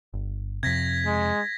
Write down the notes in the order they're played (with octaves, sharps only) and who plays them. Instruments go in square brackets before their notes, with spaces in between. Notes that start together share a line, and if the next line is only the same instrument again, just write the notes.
[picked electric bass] G1
[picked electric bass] F2 C3 [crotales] G#6 A#6 B6
[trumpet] G#3